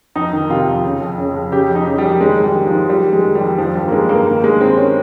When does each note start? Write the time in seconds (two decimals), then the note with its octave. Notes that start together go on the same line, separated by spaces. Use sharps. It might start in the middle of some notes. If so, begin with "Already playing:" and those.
0.16 F2 D#4
0.33 D#3
0.50 C3 F4
0.68 F2
0.85 C#3
1.01 F2
1.18 C#3
1.35 F2
1.52 C#3 G4
1.70 F2
1.75 D#4
1.87 C#3
1.98 G3
2.04 F2
2.21 D#3 G#3
2.38 G#2
2.43 G3
2.56 D#3
2.67 F3
2.73 G#2
2.89 D#3 G3
3.07 F2
3.13 G#3
3.24 D#3
3.35 G3
3.41 F2
3.58 D#3 F3
3.75 G2 G3
3.88 A#3
3.92 D#3 G#3
4.09 G2 A#3
4.27 D#3 A#3
4.43 G2 G#3
4.61 D#3 C4
4.77 C#4